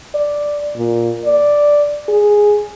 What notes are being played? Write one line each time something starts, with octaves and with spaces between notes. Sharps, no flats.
D5
A#2
D5
G#4